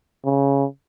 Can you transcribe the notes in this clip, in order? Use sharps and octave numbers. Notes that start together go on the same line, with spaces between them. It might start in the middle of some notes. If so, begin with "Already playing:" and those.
C#3